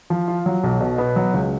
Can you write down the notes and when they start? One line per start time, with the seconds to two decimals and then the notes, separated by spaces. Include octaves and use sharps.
0.10 F3
0.28 F4
0.46 F#3
0.64 B1
0.81 B2
0.98 B3
1.16 F#3
1.34 C#2